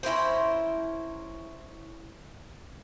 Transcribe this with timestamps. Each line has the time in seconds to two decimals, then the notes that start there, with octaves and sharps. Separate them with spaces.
0.03 C#4 E4 A#4 C5